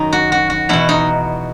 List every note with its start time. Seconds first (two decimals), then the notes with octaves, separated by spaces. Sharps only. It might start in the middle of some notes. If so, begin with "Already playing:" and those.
Already playing: F#2 D#3 D#4
0.13 F#4
0.32 F#4
0.50 F#4
0.69 E2 B2 E4
0.89 D#4